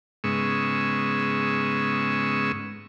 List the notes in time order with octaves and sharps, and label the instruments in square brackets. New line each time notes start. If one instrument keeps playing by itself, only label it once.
[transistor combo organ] G#2 C#3 G#3 B3 C#6 E6